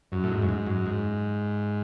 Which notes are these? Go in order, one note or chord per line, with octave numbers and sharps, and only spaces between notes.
F#2
A2
G#2
F#2
G#2
F#2
G#2